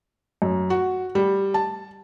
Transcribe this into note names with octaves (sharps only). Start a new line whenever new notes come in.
F#2
F#4
G3
A5